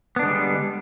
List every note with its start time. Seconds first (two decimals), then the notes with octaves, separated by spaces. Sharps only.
0.16 B3
0.19 D4
0.22 D3
0.25 G#3
0.28 G3